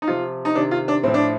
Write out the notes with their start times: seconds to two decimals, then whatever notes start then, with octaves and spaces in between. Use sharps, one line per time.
0.02 D#4
0.07 C3 F3 F4
0.45 D#4
0.55 C3 D#3 D4
0.71 F4
0.88 D4
1.03 A2 F3 C4
1.14 D4